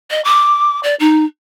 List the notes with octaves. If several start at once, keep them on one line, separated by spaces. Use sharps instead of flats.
D#5
D6
D5
D#4